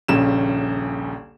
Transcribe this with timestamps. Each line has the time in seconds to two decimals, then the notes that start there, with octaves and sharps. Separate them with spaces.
0.08 D#1 A#1 C#3 C#4 E7